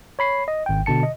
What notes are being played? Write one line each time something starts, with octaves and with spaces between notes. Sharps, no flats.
C#5 B5 C7
D#5
G#1 G5
B2 D3 A5 C#7
D#5